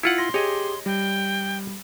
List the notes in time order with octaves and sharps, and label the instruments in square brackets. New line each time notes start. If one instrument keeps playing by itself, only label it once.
[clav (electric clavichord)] E4 F4 F#5 [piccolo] C#7
[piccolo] C6 [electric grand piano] A#6
[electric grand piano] G4 G#4 [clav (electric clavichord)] C#5 D#5
[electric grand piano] G3 [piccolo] G5